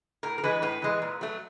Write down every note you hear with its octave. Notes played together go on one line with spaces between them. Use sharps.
A2 A#4
A#4
E3 G#3 B4
A2 B4
E3 G#3
A#2
F#3 A3